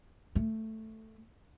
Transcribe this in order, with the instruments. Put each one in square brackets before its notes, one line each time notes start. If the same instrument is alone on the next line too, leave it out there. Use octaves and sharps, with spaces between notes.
[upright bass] A3